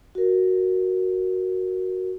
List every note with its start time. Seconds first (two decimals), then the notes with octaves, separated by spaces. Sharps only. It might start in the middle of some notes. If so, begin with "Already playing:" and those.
0.15 F#4 A#4